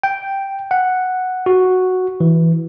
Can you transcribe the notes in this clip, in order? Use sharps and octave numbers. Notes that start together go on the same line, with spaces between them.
G5
F#5
F#4
E3